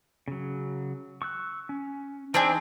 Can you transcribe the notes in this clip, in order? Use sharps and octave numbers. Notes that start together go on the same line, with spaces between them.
C#3 F#3
C#6 E6 F#6
C#4
E3 C4 D4 D#4 G#4 B5